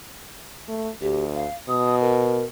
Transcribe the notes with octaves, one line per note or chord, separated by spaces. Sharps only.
A3
D2 G4
F5
B2 D#6
A#4